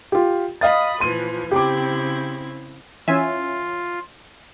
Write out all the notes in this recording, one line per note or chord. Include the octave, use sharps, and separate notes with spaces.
F4 G4
D#5 F5 B5 D#6 A6
A#2 E3 F3 C6 D#7
C#3 C4 E4 G4 D6
E3 C#4 F4 E5 G#5